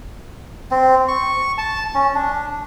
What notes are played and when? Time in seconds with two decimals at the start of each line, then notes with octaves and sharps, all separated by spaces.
0.71 C4
1.08 C#6
1.58 A5
1.94 C#4
2.15 D4